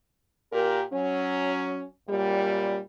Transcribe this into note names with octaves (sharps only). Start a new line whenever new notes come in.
A#2 G4 A#4
F#3 C#4
F#2 A#2 G3